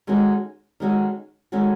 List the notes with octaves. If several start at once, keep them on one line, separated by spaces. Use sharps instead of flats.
D#3 G#3 C#4 F#4 A4
D#3 G#3 C#4 F#4 A4
D#3 G#3 C#4 F#4 A4